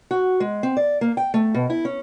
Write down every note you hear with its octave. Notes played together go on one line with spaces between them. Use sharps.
F#4
G#3
C4
D5
A#3
G5
A3
B2
E4
C#4